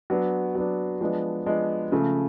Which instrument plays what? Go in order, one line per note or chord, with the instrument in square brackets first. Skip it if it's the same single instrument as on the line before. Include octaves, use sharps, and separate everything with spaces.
[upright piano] F#3 B3 D4
F#3 B3 D4
F3 G#3 B3 D4
F3 G#3 B3 D4
C#3 F3 A3